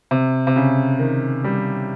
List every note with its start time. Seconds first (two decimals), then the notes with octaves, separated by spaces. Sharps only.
0.11 C3
0.47 C3
0.56 C#3
0.99 D#3
1.44 G3